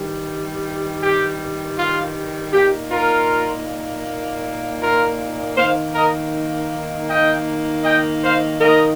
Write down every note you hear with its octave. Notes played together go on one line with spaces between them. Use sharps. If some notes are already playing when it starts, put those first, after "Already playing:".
Already playing: G2 D#3 G3
G4
F4
A#2 A#3 D#4 G4
F4 A#4
F4 A#4
D#3 A#3 D#4 C5 F5
A#4 D#5
D#5 G5
D#5 G5
C5 F5
D#3 A#3 D#4 A#4 D#5